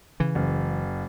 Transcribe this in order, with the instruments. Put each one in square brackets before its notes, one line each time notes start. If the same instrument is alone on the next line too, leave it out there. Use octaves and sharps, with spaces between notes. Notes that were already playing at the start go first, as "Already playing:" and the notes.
[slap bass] C#3 E3
[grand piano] F#1